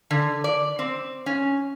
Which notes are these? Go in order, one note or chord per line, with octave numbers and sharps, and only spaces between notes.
D3
D5
C4
C#4